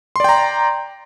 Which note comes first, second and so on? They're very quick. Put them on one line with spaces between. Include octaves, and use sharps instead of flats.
C6 D5 G5 A#5